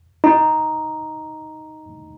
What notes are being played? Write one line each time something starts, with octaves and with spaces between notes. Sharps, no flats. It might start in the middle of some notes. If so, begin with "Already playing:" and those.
D#4